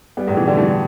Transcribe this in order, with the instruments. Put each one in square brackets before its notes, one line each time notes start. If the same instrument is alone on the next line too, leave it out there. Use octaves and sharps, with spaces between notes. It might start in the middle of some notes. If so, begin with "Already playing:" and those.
[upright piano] G3 B3
E2 A2
B2 E3
D3 G3
E3 A3